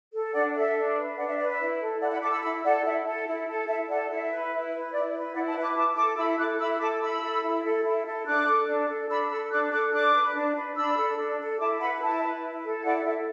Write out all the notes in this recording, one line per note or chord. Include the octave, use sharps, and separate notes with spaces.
A4
D4 D5 F#5
A4 E5
D4
B4
D4 D5 F#5
E5
B4 D5
E5
E4
A4
E4 D5 F#5
F#5 B5
A4 A5 D6
B5 E6
E4 B5 E6
A4 D5 F#5
E4 E5
A4
E4
A4
E4 E5 A5
A4 D5 F#5
E4 E5
B4
E4
B4
E4 D5
B4
E4 D5 F#5
E5 A5
B4
D6 F#6
E4 A5 D6
A4 A5 D6
E4 B5 E6
A4 D6 F#6
E4 B5 E6
A4 A5 D6
E4 B5 E6
A4
E4
A4
E4
A4
D4 D6 F#6
A4
D4
A4
D4 B5 E6
A4 B5 E6
D4 D6 F#6
A4 D6 F#6
D4 D6 F#6
B4
D4
B4
D4 B5 E6
A4
D4
A4
E4 A5 D6
B4 F#5 B5
E4 E5 A5
B4
E4
A4
E4 D5 F#5
A4 E5